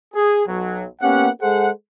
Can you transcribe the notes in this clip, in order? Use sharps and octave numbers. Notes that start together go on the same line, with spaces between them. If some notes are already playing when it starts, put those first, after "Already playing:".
G#4
B1 F#3
A#3 B3 C#4 G4 F#5
G#3 G#4 A4 C5 F#5